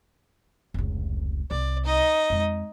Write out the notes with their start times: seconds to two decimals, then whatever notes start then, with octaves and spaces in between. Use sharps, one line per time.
0.74 F1 C#2
1.51 C2 D5
1.85 D#4 D#5
2.30 F2 G#3